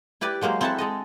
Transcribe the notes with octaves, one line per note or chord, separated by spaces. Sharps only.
E4 G4 B4 D5 B5
F#3 G#3 A#3 C5
C4 E4 A4 E5 F#5 A5
G#3 A4 D#5